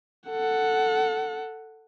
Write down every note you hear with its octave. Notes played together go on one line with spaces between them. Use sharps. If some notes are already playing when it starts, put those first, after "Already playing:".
A4 F#5